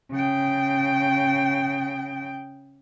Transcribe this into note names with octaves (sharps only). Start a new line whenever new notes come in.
C#3 G5